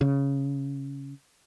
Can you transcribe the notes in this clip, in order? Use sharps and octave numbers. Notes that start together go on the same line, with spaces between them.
C#3